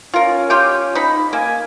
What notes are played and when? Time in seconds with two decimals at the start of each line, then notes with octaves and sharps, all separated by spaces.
0.14 C#4 F4 A#4
0.50 F4 G4 G5
0.95 D#4 B5
1.33 A#3 G#5